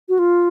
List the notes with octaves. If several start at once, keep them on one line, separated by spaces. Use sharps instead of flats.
F#4
F4